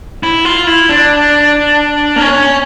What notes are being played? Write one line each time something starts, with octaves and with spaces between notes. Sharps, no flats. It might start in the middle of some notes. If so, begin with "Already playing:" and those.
E4
F4
E4
D4
A#3
C#4